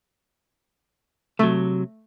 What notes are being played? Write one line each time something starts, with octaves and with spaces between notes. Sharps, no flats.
C3 F#3 A3